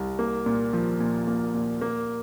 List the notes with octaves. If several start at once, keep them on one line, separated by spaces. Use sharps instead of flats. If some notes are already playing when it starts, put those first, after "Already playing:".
Already playing: C2
A#3
A#2
F3
A#2
A#3
A#2
A#3